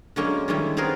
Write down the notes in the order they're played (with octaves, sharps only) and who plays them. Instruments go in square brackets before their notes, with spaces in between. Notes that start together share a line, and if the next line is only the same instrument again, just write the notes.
[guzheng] D3 F#3 G#3 A#3 C#4
D#3 G3 G#3 C#4 E4
B3 C4 D#4 F4 G#4 A#4